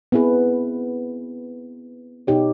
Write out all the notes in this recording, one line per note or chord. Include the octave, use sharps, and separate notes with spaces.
B3 C4 E4 G#4 B4
B2 D#4 G4 C#5